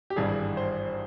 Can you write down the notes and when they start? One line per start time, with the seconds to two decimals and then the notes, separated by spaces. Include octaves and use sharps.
0.10 G4
0.16 G#1 G2 E3 G3 G#4
0.57 C5